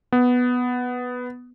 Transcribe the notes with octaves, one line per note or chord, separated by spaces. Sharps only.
B3